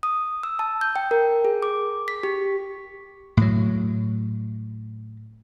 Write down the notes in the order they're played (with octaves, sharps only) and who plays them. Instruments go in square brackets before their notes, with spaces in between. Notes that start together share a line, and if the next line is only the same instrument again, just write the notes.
[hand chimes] D#6
E6
A5
G6
G5
A#4
G#4
D6
B6
G4
[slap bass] A2 F#3